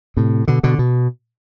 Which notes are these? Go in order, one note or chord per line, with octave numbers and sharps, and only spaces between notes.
A2 C3
B2 D3
B2 D3
B2